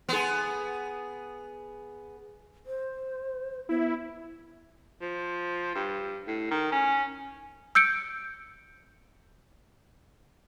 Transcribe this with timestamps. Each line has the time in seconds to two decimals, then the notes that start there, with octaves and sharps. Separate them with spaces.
0.09 B3 G#4
2.66 C5
3.69 B3 E4
5.01 F3
5.75 G2
6.27 A2
6.51 D#3
6.72 C#4
7.75 E6 G6 C#7 D7